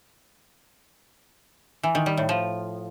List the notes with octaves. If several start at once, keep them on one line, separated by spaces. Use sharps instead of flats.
E3
D#3
G3
A2
F3